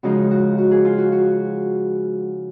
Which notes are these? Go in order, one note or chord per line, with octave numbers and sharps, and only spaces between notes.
C#3 F3 G#3 D#4 F#4
F#4
F#4
G#4
F4
F#4
F#4